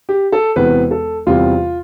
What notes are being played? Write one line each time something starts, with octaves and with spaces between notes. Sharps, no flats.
G4
A4
E1 E2 C3 B4
A4
E2 C3 G3 F4